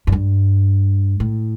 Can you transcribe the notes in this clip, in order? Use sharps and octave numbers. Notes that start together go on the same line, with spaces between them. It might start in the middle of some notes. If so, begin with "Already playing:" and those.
F#2
G2
A2